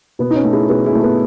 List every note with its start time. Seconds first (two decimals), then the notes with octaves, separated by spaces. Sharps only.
0.19 B2 B3
0.30 D#4
0.36 C#4
0.44 A3
0.53 E4 G#4
0.69 B2 G#4 B4
0.86 E4 G#4
0.95 A3
1.03 B3